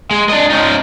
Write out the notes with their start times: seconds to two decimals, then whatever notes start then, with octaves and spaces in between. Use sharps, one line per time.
0.11 G#3
0.29 D4 D#5
0.50 C#4 D#4